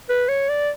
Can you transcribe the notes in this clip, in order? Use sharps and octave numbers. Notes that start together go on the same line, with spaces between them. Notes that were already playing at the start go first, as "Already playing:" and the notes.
B4
C#5
D5